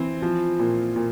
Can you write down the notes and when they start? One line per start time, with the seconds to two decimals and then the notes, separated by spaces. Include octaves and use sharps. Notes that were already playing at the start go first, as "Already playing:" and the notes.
Already playing: E3 C4
0.22 F3
0.59 A#2
0.96 A#2